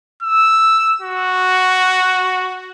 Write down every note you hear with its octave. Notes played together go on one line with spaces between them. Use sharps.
E6
F#4